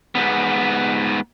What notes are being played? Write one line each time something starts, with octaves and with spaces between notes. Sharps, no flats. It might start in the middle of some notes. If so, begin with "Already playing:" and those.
G#2 B3